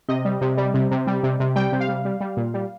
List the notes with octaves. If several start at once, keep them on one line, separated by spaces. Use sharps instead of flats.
C3 D#5
G3
C3
G3
C3
C3
G3
C3
C3
G3 G5
C3
F5
G3
G3
G3
A#2
G3